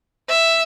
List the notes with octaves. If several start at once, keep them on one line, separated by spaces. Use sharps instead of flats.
E5